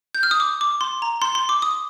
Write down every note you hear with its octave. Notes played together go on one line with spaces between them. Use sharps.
G6
F6
D#6
D6
D6
C6
A#5
C6
C6
D6
D#6